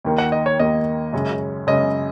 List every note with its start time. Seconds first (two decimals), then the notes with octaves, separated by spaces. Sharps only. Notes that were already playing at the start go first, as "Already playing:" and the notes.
0.05 D#2 D#3 A#3
0.18 F#5
0.32 D#5
0.46 C#5
0.59 D#2 D#3 A#3 D#5
1.13 F#2 C#3 G#3 C#4
1.67 F#2 C#3 G#3 C#4 D#5